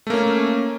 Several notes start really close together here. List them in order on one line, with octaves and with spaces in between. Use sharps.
A3 A#3 C#4